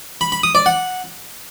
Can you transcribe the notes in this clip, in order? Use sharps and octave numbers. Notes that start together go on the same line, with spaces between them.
B5
B5
D#6
D5
F#5